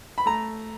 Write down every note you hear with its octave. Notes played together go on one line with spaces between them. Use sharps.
B5
A3 A#5